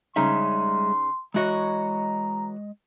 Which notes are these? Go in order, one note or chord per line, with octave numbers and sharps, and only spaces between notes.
C#3 G3 G#3 D#4 C#5 E5 C6
E3 G#3 F#4 C#5 D#5 A#5